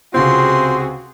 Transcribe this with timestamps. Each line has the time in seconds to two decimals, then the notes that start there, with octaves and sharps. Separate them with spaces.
0.14 C#2 C3 C4 F4 F#4 G#4 C6